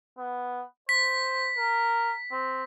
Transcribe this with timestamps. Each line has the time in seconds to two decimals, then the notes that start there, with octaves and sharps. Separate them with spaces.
0.18 B3
0.89 C5 B6
1.57 A#4
2.32 C4